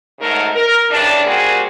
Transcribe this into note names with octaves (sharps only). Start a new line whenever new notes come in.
G#2 C#3 F#3 A3 D#4 A#4
A#4
C#3 E3 G3 D4
G3 A#3 C4 F#4 G#4